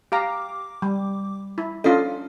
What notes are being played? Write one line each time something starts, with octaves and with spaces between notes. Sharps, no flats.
G4 F5 A#5 D6
G3
E4
C#4 D4 F4 A4 D#5